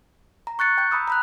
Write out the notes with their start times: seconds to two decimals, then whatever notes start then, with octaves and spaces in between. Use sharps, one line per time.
0.47 A#5
0.59 C#6 F#6 A6 C#7
0.78 G5 G6
0.91 A#5 B5 D#6 E6
1.07 A#5 B5 F#6